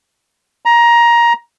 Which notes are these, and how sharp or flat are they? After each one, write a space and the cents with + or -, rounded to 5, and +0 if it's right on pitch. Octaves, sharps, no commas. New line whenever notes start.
A#5 +15